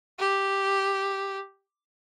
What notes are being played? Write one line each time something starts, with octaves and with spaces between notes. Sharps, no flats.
G4